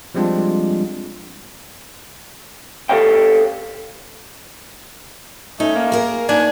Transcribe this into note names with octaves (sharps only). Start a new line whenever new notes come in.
F3 G3 G#3 C4 D4 F4
G4 A4 C#5 F5 G5
A3 C#4 D#4
A#3
G#4 A#4
A#3 D4 D#4 G#5